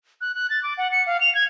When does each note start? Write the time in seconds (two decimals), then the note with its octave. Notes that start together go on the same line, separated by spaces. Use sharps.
0.21 F#6
0.35 F#6
0.50 A6
0.63 D6
0.77 F#5
0.92 C#7
1.06 F5
1.21 F7
1.35 G#6